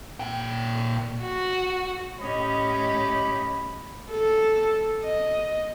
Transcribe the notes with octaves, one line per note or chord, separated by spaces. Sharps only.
A#2 G5
F#4
A2 C#4 G4 D#5 B5
A4
D#5